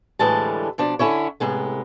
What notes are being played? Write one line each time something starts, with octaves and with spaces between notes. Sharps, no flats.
D2 A2 E3 G3 G#3 A5
B2 F3 D4
D3 C#4 E4 C#5
A2 C3 G#3 B3